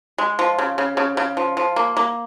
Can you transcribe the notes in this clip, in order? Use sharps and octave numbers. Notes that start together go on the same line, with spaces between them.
G#3
F3
C#3
C#3
C#3
C#3
F3
F3
A#3
A#3